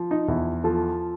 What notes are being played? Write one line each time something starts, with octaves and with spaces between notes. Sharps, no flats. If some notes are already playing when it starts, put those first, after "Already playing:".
Already playing: F3
D#4
E2 E4
F3 A4